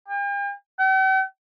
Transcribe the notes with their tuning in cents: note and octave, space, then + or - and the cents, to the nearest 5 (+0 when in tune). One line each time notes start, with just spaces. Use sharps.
G5 +45
G5 -45